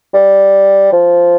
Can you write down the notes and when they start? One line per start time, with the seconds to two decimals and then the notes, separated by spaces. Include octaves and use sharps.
0.14 G3
0.93 F3